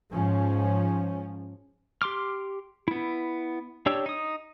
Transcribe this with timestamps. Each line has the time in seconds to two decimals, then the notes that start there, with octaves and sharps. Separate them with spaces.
0.10 G#2 F3 C#4
2.02 G4 C6 D6 F6
2.88 B3 E4
3.86 D4 G4 C#5 E6
4.06 D#4 D#6